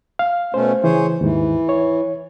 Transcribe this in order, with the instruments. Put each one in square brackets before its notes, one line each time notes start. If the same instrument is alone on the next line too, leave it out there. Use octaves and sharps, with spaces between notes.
[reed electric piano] F5
[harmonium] B2 A3 C#4 [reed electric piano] C5
[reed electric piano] C#3 E3 [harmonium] G#4 C5 C#5
[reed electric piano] D#2 G#2 [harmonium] E3
[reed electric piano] C#5